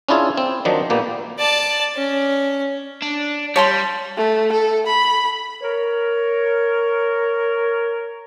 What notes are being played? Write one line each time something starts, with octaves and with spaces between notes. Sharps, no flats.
C#4 D4 E4 F4 G#4
C4
D#3 F3 F#3 D4 D#4
A#2 A#3 B3 G4
D5 A5
C#4
D4
G3 C#5 A5 C6
A3
A4
B5
A#4 C#5